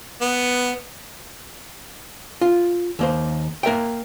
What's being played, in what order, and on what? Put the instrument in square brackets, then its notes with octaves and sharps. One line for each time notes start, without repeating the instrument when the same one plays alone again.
[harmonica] B3
[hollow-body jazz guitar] F4
D#2 A#3 C5
A#3 A#4 E5 G5